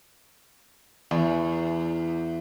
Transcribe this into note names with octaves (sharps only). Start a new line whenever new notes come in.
E2